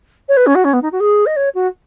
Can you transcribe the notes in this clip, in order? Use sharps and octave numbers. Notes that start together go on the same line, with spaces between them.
C#5
B4
C#4
F#4
C#4
B3
D#4
F#4
G#4
D#5
C#5
F#4